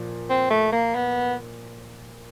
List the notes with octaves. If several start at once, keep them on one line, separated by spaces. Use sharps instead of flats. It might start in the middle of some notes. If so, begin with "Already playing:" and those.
Already playing: A#2 F3
C4
A3
A#3
B3